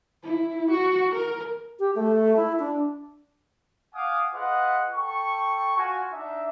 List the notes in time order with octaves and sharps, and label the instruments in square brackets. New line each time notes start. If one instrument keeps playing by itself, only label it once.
[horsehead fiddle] E4
F#4
A#4
[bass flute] G4
A3
E4
D4
[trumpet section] F5 F#5 G#5 D6 D#6
F4 G#4 B4 D#5 F#5
A4 G5 C#6
F4 F#4 G#5
D4 D#4 E5